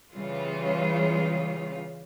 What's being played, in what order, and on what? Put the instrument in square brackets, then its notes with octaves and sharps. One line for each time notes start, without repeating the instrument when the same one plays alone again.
[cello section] C#3 E3 G3 F4